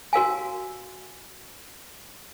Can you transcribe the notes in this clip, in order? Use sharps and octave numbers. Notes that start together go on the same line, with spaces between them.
F#4 A#4 F5 G#5